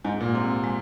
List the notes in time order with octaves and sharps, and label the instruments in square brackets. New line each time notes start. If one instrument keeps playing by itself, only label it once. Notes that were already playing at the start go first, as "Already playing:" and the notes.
[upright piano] G#2 [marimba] G#3
[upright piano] A#2
[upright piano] C3 [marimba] C4
[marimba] G#3